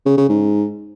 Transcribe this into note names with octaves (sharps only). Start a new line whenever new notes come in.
C#3
C#3
G#2